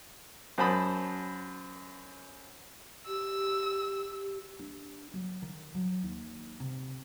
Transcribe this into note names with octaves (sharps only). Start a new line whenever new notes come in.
F#2 C5 A5 B5 D#6
G4 E6
D4
F#3
D#3
F#3
D#2
C3